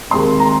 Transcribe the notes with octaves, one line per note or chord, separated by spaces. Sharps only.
D#2 D#3 G#3 C4 C6
A#5